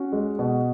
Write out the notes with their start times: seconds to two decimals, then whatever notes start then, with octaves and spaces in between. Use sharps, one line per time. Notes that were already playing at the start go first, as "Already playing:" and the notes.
Already playing: C#4 F#4
0.12 G#3
0.39 B2